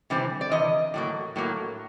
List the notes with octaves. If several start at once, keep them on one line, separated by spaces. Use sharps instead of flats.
C3 E3 G3 C4
D5
C3 E3 D#5
A2 F#3 A#3
A2 F#3 A#3